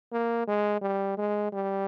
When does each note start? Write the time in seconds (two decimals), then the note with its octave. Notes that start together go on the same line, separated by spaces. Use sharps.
0.12 A#3
0.48 G#3
0.82 G3
1.18 G#3
1.52 G3